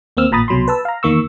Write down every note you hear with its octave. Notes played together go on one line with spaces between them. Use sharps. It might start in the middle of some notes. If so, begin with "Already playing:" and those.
D#2 A#3 C4 E6 F6
A1 A#2 A#5 B5 D#6 A6
C2 B2 F#3 B5 C6
B4 A5 E6
F5 A#5
E2 D#3 A#3 C#6 E6